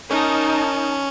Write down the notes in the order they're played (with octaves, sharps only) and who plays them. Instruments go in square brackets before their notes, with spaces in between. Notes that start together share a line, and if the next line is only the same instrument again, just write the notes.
[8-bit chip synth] C#4 [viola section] D#4 A#4 A5